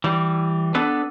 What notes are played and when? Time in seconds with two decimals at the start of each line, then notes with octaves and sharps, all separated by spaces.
0.04 E3 G3
0.75 B3 D4 A4 B4